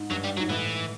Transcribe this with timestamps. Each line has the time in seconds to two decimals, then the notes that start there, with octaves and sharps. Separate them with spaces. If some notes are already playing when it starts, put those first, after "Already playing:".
Already playing: G#2
0.10 G2 F#3
0.24 G3
0.37 F#3
0.40 G#2
0.49 A2 E3